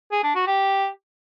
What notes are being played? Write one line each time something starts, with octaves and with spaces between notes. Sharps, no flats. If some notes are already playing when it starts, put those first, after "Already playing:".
G#4
D4
F#4
G4